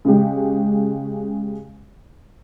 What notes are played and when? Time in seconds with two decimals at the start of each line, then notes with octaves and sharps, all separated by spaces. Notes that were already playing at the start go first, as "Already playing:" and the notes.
0.05 C#3 G#3 G4